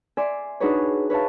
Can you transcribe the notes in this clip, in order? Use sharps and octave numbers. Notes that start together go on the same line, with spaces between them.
D5 E5 G#5 C6
D4 D#4 F#4 G#4 B4 C#5
B4 C#5 E5 F5 A5